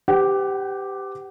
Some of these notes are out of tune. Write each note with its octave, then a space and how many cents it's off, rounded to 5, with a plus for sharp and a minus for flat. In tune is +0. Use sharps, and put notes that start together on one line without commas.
G4 +0 B4 +45 F#5 +35